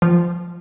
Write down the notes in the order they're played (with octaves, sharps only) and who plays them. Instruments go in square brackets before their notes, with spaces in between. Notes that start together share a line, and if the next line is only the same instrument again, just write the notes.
[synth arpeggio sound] F3